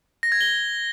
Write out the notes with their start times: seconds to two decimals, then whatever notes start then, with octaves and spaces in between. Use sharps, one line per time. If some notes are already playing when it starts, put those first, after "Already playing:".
0.23 A#6
0.32 G#6
0.41 G7